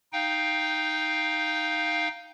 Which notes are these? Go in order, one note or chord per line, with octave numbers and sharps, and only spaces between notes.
D#4 F5 G5